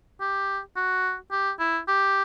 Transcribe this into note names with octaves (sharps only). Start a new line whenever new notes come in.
G4
F#4
G4
E4
G4